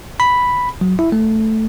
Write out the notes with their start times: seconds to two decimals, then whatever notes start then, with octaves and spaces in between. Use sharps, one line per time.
0.20 B5
0.81 F#3
0.99 E4
1.12 A3